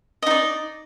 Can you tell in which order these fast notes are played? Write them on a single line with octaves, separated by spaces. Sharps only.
D#5 D#4 D5